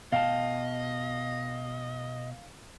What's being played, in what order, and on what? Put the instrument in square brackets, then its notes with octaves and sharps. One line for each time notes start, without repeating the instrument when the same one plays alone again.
[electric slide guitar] B2 G5 A5 [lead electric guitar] D#5 [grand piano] F5